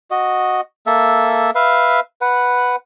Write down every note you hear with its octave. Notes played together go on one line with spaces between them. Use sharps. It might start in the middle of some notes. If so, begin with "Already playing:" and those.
F#4 D#5
A#3 A4 E5
B4 E5 F5
B4 F#5